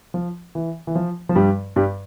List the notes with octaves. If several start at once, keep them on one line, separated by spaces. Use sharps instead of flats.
F3
E3
E3
F3
F3
G2 G3
G2 G3